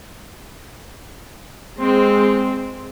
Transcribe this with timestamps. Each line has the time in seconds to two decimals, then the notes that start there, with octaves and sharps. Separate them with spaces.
1.78 G#3 C4